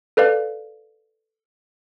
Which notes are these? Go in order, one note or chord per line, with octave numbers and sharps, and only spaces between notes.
A4 B4 D5 F5